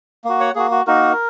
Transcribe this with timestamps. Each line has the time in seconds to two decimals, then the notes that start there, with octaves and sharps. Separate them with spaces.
0.25 A#3 F#4
0.40 C#5 F#5
0.55 A#3 F#4 G#4
0.71 F#4
0.87 A#3 D#4 F#4 A#4